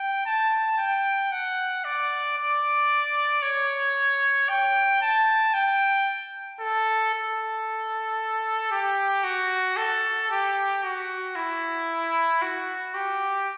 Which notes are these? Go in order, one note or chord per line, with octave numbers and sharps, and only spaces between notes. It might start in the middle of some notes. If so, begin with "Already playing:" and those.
Already playing: G5
A5
G5
F#5
D5
D5
C#5
G5
A5
G5
A4
A4
G4
F#4
A4
G4
F#4
E4
F#4
G4